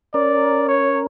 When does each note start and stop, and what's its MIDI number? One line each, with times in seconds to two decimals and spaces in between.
0.14 1.07 61
0.14 1.07 70
0.14 0.68 74
0.68 1.00 73